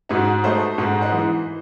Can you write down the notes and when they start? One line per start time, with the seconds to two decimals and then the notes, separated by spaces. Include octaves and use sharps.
0.09 G#2 D#4 F#4
0.44 A3 C5 D#5
0.78 G#2 F#5
1.01 D#5 F#5
1.13 E3